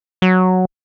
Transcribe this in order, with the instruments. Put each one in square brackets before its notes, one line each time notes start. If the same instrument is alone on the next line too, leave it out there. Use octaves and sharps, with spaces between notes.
[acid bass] F#3